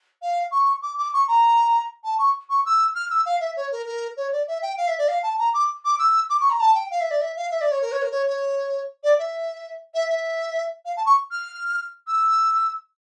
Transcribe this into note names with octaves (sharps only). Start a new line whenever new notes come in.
F5
C#6
D6
D6
C#6
A#5
A5
C#6
C#6
E6
F6
E6
F5
E5
C#5
A#4
A#4
C#5
D5
E5
G5
F5
E5
D5
F5
A5
A#5
D6
D6
E6
D6
C#6
A#5
A5
G5
F5
E5
D5
E5
F5
E5
D5
C#5
A#4
C#5
A#4
C#5
C#5
D5
E5
E5
E5
F5
A5
C#6
F6
E6